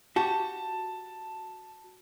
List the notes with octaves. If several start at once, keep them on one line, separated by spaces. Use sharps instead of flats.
F#4 G4 A5